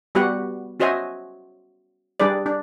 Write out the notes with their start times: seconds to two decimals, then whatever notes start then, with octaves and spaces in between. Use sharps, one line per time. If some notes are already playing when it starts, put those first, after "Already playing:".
0.15 G3 B3 F#4 G4 B4 F#5
0.80 C#4 F#4 C5 D#5 E5 G#5
2.20 G3 D4 G#4 B4 D5
2.46 D4